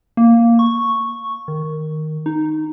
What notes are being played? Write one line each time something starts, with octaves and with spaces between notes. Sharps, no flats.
A#3
C#6
D#3
D#4